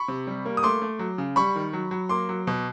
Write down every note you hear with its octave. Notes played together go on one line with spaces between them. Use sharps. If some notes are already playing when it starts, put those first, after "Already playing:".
Already playing: B5 C#6
C3
G3
A#3
D#6
A3 C6 D6
A3
F#3
C#3
G3 B5 C#6
D#3
F#3
F#3
A#3 C6 D6
F#3
B2